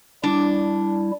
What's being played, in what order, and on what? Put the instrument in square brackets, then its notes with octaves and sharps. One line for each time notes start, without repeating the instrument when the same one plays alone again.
[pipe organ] G3 E4 [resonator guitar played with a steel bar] D4